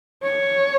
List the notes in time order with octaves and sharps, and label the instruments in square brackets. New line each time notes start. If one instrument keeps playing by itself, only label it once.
[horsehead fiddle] C#5